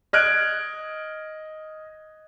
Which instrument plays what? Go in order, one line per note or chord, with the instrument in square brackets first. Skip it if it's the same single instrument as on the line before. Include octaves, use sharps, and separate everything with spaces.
[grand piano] D#5 F6 F#6 G#6 D7